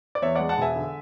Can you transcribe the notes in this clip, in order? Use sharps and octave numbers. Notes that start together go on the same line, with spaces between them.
D5
E2 C#5 E5
G#3 D5 F#5
F#5 A5
E1 E5 G#5
D3